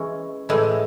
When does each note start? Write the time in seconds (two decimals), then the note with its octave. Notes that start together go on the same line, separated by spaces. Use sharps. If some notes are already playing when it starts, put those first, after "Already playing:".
Already playing: E3 G#3 C#4
0.49 A2 E3 G#3